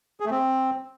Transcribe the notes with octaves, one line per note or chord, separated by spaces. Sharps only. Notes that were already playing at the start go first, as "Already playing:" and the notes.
G#4
A3
C4